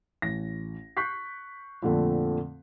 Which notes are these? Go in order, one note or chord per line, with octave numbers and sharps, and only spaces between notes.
A1 A#6
C#6 F#6 G6 B6 C7
F2 A#2 D3 A3 C4